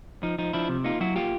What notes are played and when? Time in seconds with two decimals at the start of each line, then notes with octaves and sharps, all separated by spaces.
0.23 F3 D#4
0.38 F3 D#4
0.53 F3 D4 E4
0.69 C3
0.84 A#3 D#4 F4
1.01 F#3 E4 F#4
1.16 A#3 F4 G4